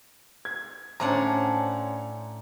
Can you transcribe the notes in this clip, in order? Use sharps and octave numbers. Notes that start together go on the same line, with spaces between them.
G#6
A2 C#4 D4 C5 F#5 A#5